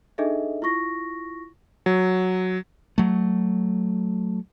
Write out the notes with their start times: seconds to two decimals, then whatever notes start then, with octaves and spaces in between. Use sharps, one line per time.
0.18 D4 D#4 G#4 A4 D#5 E5
0.62 E4 F4 C#6 A#6
1.86 F#3
2.98 F#3 A3